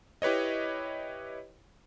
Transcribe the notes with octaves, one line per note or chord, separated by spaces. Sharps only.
E4 G4 B4 C#5 D#5